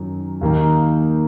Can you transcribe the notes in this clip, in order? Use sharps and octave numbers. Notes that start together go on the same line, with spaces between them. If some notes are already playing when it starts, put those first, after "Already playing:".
Already playing: F#2 D#3 F#3
D#2 D#3 A#3 D#4